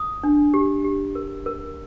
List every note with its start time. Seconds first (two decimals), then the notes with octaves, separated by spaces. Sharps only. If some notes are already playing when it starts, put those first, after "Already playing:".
Already playing: D#6
0.23 D4
0.54 G4
0.84 G4
1.15 A#4
1.46 A#4